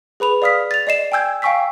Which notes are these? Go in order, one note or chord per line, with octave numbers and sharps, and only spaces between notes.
G#4 B4 B5 F7
D5 F5 D#6 F6 B6
A6 F7
D5 D#5 C7 E7
G5 G#5 E6 G6 G#6
F5 G5 G#5 C#6 E6 B6